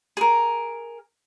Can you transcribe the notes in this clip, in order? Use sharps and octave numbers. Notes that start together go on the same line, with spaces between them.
G#4 A#4